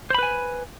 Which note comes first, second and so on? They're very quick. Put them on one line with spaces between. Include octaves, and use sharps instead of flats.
C5 B5 B4 G#5